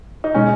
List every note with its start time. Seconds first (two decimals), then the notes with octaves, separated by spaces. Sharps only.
0.24 D#4
0.35 B2 G#3 C#4 D#4